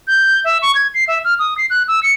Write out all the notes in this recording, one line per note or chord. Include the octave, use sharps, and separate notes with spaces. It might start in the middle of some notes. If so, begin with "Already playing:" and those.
G6
E5
C#6
G#6
C7
E5
F6
D#6
C7
F#6
E6
C#7